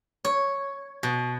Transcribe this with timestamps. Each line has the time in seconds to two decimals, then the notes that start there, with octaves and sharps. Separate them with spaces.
0.25 C#5
1.03 B2